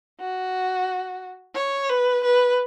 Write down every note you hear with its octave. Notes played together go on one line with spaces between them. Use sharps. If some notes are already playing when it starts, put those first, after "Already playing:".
F#4
C#5
B4
B4